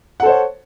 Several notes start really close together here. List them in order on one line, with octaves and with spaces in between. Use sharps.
F#5 A4 C5 C#5